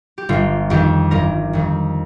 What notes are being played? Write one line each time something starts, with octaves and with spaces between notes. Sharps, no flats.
G4
G1 F4
F2 D#3 G4
G1 A#4
F2 D#3